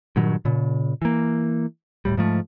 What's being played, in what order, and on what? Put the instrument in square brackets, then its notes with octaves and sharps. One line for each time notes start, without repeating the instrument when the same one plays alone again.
[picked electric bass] G2 A#2 D#3 F#3
A#2 C#3
E3 A#3
D1 B1 A2 G3
G#2 F3 A3